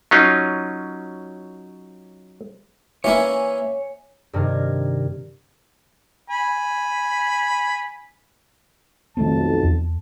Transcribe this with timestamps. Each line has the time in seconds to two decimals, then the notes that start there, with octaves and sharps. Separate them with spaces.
0.11 F#3 C#4 D#4 F4
3.04 E3 A#3 E4 C#5 G#5
4.33 G2 C3 D#3 A#4 G#6
6.29 G#5 B5
9.17 B1 F2 D#3 A3 C4 A5
9.63 E2